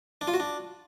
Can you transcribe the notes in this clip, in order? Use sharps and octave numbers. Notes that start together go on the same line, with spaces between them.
D4
F4
F#4
D4